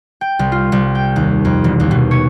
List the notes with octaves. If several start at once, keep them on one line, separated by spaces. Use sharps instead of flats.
G5
C2
F4
C2
G5
D#2
F2
E1
D#2
B2
C#5